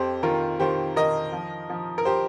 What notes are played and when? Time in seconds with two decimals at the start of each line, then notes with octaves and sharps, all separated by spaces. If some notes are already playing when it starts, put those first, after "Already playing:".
Already playing: F2 G4 C5
0.23 D#3 F4 A#4
0.60 D#3 G4 C5
0.96 D#3 A#4 D#5
1.32 F3
1.70 F3
1.98 A#4
2.05 G4 C5